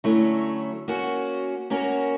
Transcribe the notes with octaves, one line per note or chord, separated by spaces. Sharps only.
D3 F#3 A3 C#4 E4
A#3 C#4 F#4
A#3 C#4 F#4 A#4